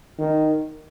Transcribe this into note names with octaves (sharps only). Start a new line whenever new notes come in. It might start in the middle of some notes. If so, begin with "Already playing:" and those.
D#3